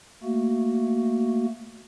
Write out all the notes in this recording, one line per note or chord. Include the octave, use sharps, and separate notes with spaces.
A3 A#3 F#4